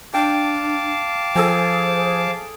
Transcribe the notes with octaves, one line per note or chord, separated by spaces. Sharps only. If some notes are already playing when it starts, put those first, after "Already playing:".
D4 F5 G5 A5 D6
F3 G#4 A4 C5 G#5